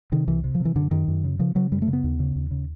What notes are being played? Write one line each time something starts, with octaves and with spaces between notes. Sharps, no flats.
C3 D#3
C2 E3
C3
F3
C3
E3
F#2 D3
F#2 D#3
F#2
C#3
C#3 F3
C#3 F#3
F#2 G3
A3
C#3
B3
D#2
C#3
D#2
C#3